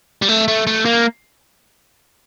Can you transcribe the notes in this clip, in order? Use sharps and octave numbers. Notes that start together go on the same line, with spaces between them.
G3
A3
A3
A3
A#3